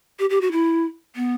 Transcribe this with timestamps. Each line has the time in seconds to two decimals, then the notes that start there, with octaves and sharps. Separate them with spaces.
0.19 G4
0.30 G4
0.41 F#4
0.52 E4
1.16 B3